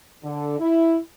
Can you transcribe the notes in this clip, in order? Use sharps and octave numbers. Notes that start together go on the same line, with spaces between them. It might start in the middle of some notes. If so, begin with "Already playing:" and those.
D3
E4